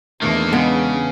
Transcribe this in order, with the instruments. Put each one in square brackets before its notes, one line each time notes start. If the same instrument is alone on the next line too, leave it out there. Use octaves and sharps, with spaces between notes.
[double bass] E2 D4 [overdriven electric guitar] D#3 A#3 [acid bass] A3
[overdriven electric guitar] C#3 [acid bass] G#3 [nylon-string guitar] B3